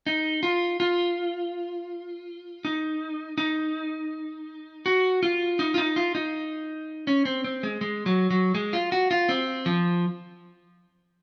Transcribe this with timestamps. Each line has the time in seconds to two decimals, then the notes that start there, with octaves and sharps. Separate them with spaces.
0.07 D#4
0.43 F4
0.80 F4
2.65 D#4
3.38 D#4
4.86 F#4
5.23 F4
5.59 D#4
5.74 F4
5.78 D#4
5.96 F4
6.15 D#4
7.07 C#4
7.25 C4
7.44 C4
7.63 G#3
7.81 G#3
8.06 F#3
8.30 F#3
8.55 G#3
8.73 F4
8.92 F#4
9.11 F4
9.29 C4
9.66 F3